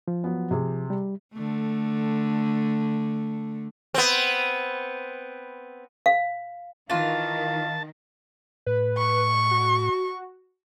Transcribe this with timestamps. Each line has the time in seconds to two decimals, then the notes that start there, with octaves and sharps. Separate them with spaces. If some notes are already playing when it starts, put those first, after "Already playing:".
0.08 F3
0.24 F#3 B3
0.51 C3 G#4
0.90 G3
1.34 D3 A3
3.94 B3 C4
6.06 F5
6.90 D#3 E3 F4 F5 A5
8.66 A2 B4
8.98 C#6
9.51 F#4